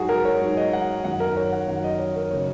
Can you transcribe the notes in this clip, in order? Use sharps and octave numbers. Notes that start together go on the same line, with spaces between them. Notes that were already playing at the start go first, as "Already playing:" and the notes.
Already playing: G#2 F#3 F#4 G#4
A#4
C#5
G#2 F#3
D#5
F#5
F#2 D#3 F#3 F#5
A#4
C#5
F#5
F#2 D#3 F#3 F#5
D#5
C#5
A#4
C#3 F#3 C#5